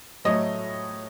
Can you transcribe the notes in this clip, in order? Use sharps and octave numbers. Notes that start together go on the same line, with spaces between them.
A2 F#3 A3 C#5 D#5